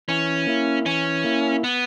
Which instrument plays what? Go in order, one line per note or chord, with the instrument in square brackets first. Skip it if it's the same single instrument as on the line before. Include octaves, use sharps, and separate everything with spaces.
[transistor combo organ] E3 [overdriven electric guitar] C#4
[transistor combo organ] A#3 E4
[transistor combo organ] E3 [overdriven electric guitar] C#4
[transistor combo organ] A#3 E4
[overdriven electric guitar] B3